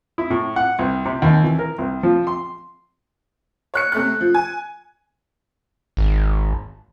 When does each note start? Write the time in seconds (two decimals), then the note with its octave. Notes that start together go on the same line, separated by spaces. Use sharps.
0.18 E4
0.30 A2
0.56 F#5
0.79 C2
1.05 C3
1.22 D#2
1.43 E3
1.59 A#4
1.78 C2
2.03 F3
2.27 C6
3.74 C#5 F#6 C#7
3.92 C3 A3 F#6
4.21 F3
4.34 G#5
5.97 G#1